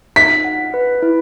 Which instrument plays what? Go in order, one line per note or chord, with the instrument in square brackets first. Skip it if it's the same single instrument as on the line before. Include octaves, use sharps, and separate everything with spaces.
[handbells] D#4 [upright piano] B6
[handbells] F#5
B4
E4